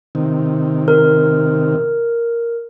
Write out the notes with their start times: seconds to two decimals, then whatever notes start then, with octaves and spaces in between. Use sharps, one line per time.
0.15 C3 D#3
0.88 A#4